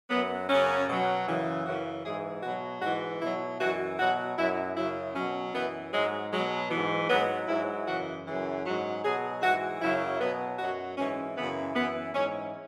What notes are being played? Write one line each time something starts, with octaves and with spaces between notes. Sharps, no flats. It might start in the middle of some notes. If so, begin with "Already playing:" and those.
F#2 F#3 B3
F#2 C#3 F#3 C#4
B2 F#3
F#2 C#3 E3
F#2 C#3 E3 F#4
G#2 E3 G#4
B2 F#3 F#4
G#2 E3 F#4
B2 F#3 E4
F#2 E3 F#4
B2 F#3 F#4
F#2 F#3 E4
F#2 C#3 F#3 E4
B2 F#3 C#4
F#2 E3 B3
G#2 F#3 G#3
B2 F#3 G#3
G#2 E3 B3
G#2 F#3 B3
G#2 F#3 E4
F#2 C#3 E3 F#4
F#2 C#3 E3
G#2 F#3 F#4
B2 F#3 G#4
G#2 E3 F#4
F#2 C#3 F#3 E4
B2 F#3 B3
F#2 F#3 F#4
G#2 E3 C#4
F#2 C#3 E3 B3
F#2 E3 B3
G#2 E3 C#4